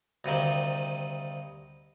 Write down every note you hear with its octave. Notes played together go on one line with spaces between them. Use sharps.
D2 G2 C3 D#3